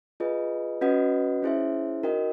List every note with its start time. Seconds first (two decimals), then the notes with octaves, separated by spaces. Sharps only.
0.20 F4 G#4 B4 D#5
0.81 C#4 F#4 B4 D#5 F#5
1.42 C#4 E4 G#4 C5 E5
2.03 D#4 F#4 A#4 D#5 G5